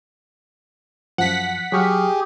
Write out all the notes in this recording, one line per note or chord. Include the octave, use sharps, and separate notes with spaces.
F#2 F3 F#5 B6
F#3 G4 G#4 C#6 F6